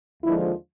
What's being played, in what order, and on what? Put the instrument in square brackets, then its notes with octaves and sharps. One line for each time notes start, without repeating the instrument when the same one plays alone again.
[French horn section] D#2 D3 F3 G#3 [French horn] E4